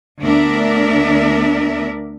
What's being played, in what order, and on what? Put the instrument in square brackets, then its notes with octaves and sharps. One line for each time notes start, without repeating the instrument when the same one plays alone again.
[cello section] D2 B3 D4 A#4 D5 E5